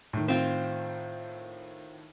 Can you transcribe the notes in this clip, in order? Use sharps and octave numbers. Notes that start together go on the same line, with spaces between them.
A2 D#3
C4 F4